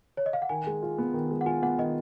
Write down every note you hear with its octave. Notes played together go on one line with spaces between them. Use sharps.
C#5
D#5
F5
F#5
D#3 G#5
G#3
F4
B3
D#3
G#3
F#5
F4 G#5
B3 F#5
D#3 D#5